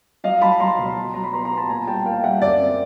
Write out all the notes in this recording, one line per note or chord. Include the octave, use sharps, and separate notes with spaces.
F#3 D#5 F5
F#3 A5 B5
F#3 A#5 C6
B2
F#3
F#3 A#5
B5
B3 A#5 C6
A#5 C6
B3
A5 B5
A#2 G#5 A#5
G3 G5 A5
A#3 F5 G5
G3 E5 F#5
F#2 D5 E5
C4